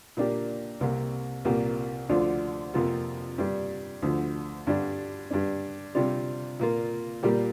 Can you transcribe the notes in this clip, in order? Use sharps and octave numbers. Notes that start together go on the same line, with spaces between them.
A#2 A#3 D4 G4
C2 C3 A#3
C2 A#2 A#3 G4
D2 D3 F3 D4 F4
F2 C3 A#3 F4
G2 G3 D4
D2 D3 F3
G2 D3 G3 D4
G2 G3 D4
C3 G3 D4 F4
A#2 A#3 F4
A#2 G3 A#3 G4